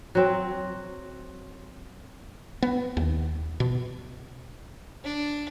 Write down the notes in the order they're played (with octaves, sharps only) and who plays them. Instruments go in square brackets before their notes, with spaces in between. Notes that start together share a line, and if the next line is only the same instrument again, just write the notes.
[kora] F#3 C4
[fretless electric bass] B3
D#2
B2
[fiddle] D4